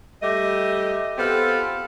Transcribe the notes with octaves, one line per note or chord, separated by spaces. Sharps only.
G3 A3 G4 D#5
B3 C4 F4 G4 A4